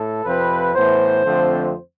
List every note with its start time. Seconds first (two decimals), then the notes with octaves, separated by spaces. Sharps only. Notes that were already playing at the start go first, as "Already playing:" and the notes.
Already playing: A2 A4
0.24 F2 C3 F3 C4 B4
0.75 A2 E3 B3 C5
1.24 F2 D3 F3 A3 C4